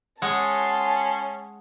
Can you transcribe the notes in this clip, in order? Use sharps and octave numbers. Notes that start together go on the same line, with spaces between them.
G#3 C#4 F#5 A5 C6